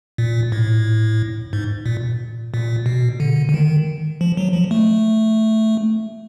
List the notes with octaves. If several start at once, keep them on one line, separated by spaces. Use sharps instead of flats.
A#2
A2
G#2
A#2
A#2
B2
D3
D3
D#3
F3
F#3
F3
A3